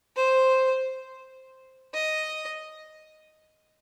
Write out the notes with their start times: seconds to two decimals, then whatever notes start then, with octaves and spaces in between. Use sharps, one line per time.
0.16 C5
1.94 D#5